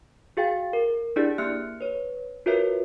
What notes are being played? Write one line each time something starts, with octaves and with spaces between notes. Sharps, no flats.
F#4 G#4 F5 G5 A6
A#4
D4 E4 G4 G#4 D5
A#3 G4 E5 F6 F#6 C#7
B4 C#5
F4 F#4 A#4 B4 C#5 E5